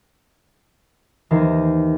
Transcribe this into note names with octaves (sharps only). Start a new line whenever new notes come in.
D#2 E3 C5 A#5 C7